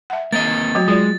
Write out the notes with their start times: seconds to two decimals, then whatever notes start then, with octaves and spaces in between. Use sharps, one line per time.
0.10 E5 F#5
0.32 A#3 C4 D#5 A6
0.75 F#3 A3 F#4
0.88 G#3 F4 D5